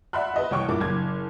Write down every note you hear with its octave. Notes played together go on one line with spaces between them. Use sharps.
D5 E5 F#5 B5 C6 F#6
B4 D#5 E5
C2 E3 C#5 G5 C#6
G2 A#2 E4 D6
F#1 G#6